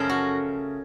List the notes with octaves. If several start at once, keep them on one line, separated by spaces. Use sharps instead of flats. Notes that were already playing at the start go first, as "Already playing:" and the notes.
Already playing: F#2 C#3 F3 A3 C#4 A#4
F#4